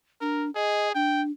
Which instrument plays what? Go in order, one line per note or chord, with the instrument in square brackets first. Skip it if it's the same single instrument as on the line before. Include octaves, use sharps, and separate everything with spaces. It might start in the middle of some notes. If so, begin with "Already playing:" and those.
[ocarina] D4 [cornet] A#4
[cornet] G#4 [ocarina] D#5
[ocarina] D4 [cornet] G5